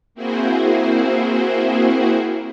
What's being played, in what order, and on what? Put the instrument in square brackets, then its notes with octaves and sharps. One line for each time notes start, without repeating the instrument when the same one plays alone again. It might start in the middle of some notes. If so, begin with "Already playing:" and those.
[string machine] A#3 C4 E4 F#4 G#4 C5